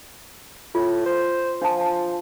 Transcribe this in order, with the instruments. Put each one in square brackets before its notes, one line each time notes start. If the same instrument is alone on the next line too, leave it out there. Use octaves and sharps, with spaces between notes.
[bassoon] A2 [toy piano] F4
[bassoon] C5
[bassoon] F3 [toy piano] D4 A5